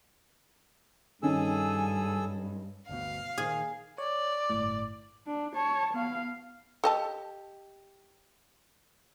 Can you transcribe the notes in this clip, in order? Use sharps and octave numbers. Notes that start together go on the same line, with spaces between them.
G2 D#3 C#4 G#4 A4 G#5 E6
G1 D2 B2 F5
A#2 D#3 G#4
C#5 D5
G1 A2
D4
C#5 A5
B3 F5
G4 A4 D#5 A5